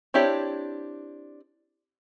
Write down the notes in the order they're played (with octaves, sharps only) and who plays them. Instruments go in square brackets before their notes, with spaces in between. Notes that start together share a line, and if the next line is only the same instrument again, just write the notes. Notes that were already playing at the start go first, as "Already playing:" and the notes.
[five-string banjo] C4 D4 E4 G4 C#5